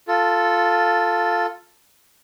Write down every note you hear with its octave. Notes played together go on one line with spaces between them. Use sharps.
F4 A4